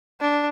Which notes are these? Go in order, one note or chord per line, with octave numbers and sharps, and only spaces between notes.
D4